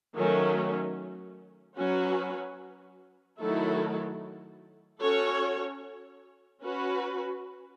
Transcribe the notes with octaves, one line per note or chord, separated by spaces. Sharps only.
D#3 F#3 A3 C#4
F#3 C#4 F#4 B4
D#3 F#3 A3 E4 A4
C#4 F#4 A4 C#5
C#4 F#4 B4